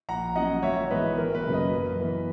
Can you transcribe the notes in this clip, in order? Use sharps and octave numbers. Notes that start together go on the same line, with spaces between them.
A#1 F#5 A#5
A#2 F#3 C#4 D#5 F#5
G#1 C#5 E5
G#2 E3 G#3 B3 B4 D#5
G#1 A#4
B4
F#2 C#3 F#3 A#3
B4 D#5
F#2
E3 B3